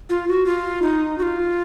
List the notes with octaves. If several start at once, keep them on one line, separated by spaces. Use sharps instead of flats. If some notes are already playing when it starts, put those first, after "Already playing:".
F4
F#4
F4
D#4
F#4
F4